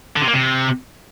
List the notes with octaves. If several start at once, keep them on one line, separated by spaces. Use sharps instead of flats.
D3
C3
A#3
C3